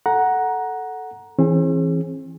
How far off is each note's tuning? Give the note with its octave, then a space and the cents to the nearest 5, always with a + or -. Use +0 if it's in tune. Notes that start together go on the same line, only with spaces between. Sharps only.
A4 +0 F#5 +0 A#5 +15
E3 +0 C4 +45 G#4 +0